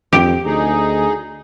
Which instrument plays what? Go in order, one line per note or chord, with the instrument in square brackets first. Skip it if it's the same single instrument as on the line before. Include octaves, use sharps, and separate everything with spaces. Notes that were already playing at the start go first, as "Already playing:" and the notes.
[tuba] F2 [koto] G4
[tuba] D2 [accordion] D#4 G#4